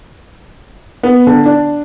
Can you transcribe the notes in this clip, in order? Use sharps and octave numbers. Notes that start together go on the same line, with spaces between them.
B3
D3
D4